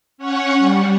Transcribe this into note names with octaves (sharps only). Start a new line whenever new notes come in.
C#4 C#5 F#5 C#6
G3